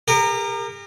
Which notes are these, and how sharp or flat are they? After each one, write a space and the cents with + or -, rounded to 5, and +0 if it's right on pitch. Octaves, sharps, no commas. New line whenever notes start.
G4 +45 A#4 -15